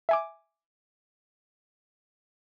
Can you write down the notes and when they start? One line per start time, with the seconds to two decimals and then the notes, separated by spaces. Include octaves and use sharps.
0.09 E5 G#5 D6